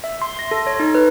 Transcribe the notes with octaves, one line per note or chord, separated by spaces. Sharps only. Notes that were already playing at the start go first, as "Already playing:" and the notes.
E5
C6
A#6
A4
C#5
D#4
B4